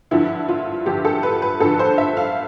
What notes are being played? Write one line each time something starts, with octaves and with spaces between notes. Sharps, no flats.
G2 D3 F3 E4
F4
G2 D3 F3 G4
A4
B4
B4
G2 D3 F3 A4
C5
E5
F5